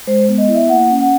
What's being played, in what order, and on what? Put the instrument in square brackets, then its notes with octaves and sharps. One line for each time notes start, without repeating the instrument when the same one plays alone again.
[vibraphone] G#3 C5
B3
D#5
E4
E5
A#3 F#5
C#4
F#5